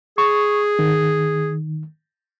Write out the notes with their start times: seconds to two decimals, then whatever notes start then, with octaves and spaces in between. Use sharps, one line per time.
0.18 G#4 C#6
0.79 D#3